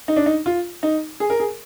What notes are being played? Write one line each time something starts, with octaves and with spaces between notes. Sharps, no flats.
D#4
D4
D#4
F4
D#4
G#4
A#4
G#4